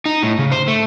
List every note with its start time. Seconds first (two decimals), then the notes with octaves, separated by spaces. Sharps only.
0.06 D#4
0.23 A2
0.39 C#3
0.52 C5
0.68 A3